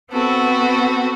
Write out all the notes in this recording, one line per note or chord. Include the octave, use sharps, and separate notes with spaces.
B3 C4 F#4 A4